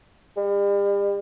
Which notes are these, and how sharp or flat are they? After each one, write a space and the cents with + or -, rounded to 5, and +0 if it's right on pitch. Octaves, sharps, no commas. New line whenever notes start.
G3 +40